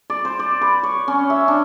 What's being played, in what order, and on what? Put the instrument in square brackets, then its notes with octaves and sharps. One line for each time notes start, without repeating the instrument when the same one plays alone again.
[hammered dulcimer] D5
C5
D5
B4
C#5
C#4
E5
D4